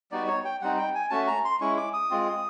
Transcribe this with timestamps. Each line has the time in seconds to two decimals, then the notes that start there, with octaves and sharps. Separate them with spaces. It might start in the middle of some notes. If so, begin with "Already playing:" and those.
0.11 G3 B3 D#4 F#4 D5
0.27 C#5
0.45 G5
0.61 G3 C4 D#4 F#5
0.78 G5
0.95 G#5
1.10 A3 C#4 F#4 A5
1.28 A#5
1.45 C6
1.60 G#3 C#4 E4 C#6
1.77 D6
1.93 D#6
2.11 G#3 C4 F4